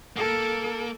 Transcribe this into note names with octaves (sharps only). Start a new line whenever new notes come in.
A#3 A4